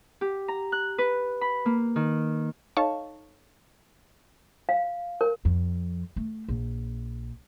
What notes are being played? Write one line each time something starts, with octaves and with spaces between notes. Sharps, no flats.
G4
A#5
F#6
B4
B5
A#3
D#3
D#4 A4 C#5 F5 A5 C#6
F5
A#4
F2
A3
A#1